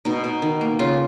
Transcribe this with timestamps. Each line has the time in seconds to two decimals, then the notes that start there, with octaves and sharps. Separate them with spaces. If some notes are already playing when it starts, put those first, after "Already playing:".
0.05 B2 D#4
0.24 B2
0.42 D#3
0.61 A#3
0.79 C#3 F4